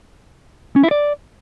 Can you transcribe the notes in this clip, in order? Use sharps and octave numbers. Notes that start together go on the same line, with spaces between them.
C#4
E4
D5